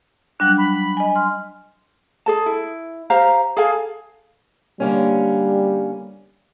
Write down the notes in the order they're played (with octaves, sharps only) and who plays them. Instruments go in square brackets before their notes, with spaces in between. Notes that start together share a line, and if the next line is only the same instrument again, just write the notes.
[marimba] F#3 G3 D4 [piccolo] F#6
[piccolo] B5
[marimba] D#5 G#5
[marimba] C6 [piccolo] F6
[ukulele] G#4 A4 A5
E4
G4 C5 F5 A#5
G#4 A4 F5 G#5
[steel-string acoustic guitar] D3 A#3 C#4 [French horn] G3